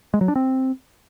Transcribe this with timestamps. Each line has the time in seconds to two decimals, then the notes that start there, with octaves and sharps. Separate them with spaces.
0.14 G#3
0.21 F#3
0.28 D4
0.36 C4